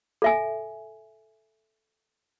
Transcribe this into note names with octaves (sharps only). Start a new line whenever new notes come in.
A4 E5 G#5